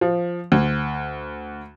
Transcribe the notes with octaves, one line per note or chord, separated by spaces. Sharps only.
F3
D2